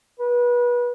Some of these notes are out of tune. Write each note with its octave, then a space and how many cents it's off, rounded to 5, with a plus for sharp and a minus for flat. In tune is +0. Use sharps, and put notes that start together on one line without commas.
B4 -30